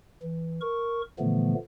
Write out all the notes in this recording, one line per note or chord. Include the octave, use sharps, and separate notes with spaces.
E3
A#4 C#6
A#2 D3 E3 F3 A3 B3